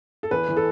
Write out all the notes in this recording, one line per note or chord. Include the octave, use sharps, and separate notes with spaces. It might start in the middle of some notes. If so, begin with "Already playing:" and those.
A4
E2 B4
E3
A4